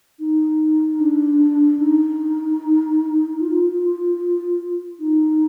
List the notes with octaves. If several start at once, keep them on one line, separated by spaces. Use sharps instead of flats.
D#4
D4
D#4
F4
D#4